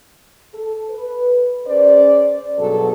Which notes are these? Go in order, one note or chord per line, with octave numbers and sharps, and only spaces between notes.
A4
B4
C#4 G#4 C5 D5
G2 B2 F#3 G#4 A4